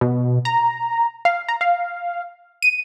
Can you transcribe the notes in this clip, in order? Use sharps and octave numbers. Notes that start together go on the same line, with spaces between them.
B2
A#5
F5
A#5
F5
D#7